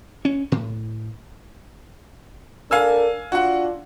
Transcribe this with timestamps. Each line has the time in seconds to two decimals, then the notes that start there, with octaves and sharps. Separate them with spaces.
0.25 C#4
0.52 A2
2.71 D4 A4 A#4 F5 G#5 E6
3.32 D4 F4 F#4 F#5